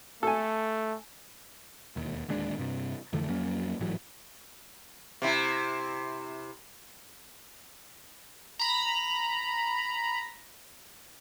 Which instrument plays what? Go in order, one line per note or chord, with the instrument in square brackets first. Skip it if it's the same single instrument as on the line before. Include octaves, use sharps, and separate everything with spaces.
[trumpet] A3 [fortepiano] A4 G#5
[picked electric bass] E1 D#2
D1 D#2 G#3 D4
G2 C3
F2 D3 E3 A3
F2 F#3 A#3 C#4
A1 G#2 E3 F#3
[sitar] C3 E4
[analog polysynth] A#5 B5